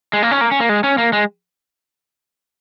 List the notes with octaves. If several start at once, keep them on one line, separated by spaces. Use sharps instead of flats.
G#3
A#3
C#4
A#3
C#4
A#3
G#3
C#4
A#3
G#3